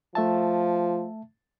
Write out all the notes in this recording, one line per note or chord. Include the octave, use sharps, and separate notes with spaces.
F3 A3 E5 A5